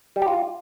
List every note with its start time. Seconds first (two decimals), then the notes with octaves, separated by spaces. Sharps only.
0.16 G3
0.22 G4
0.28 F4